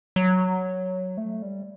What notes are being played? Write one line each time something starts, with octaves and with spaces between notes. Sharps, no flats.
F#3
A3
G3